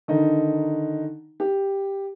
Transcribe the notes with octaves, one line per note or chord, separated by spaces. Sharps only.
D3 D#3 D#4
G4